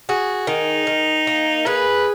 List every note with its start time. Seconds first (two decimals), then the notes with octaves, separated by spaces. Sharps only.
0.09 F#4 G#4
0.47 D#3 D#4
0.87 D#3
1.27 A#3
1.66 G#4 B4